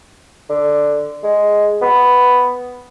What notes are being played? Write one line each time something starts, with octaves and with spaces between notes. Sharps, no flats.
D3
G#3
B3